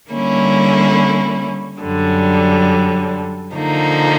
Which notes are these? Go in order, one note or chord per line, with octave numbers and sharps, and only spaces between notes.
D3 G3 A#3 C#4 E4
F#2 D3 G3
D3 F3 A#3 D#4